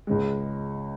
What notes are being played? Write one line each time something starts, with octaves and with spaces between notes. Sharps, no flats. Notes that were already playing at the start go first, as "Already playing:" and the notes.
C#2 C#3 G#3